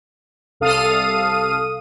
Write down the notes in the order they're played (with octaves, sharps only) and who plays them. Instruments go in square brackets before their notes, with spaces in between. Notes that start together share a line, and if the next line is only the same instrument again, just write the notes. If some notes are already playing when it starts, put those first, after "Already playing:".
[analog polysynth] C2 A4 F5 D#6 D#7